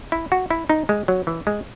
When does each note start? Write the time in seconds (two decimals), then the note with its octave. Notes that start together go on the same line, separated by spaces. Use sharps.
0.12 E4
0.32 F#4
0.50 E4
0.69 D#4
0.89 G#3
1.08 F#3
1.27 E3
1.47 G#3